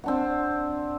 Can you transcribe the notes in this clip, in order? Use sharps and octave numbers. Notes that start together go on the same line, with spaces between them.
C4 D4 F#5